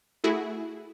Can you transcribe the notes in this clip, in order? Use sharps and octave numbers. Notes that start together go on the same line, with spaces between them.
A3 E4 F#4 G#4